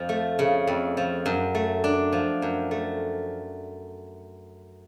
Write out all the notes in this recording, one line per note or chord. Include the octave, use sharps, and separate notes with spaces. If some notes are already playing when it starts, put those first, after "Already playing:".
Already playing: F2 F3
A3
C#3
F2
F3
F#2
A3
D4
F3
F#2
A3